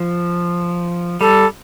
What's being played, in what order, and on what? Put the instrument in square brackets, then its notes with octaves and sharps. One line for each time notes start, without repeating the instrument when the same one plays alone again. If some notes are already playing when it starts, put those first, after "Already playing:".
Already playing: [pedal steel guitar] F3
[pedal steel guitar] G3 [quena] A4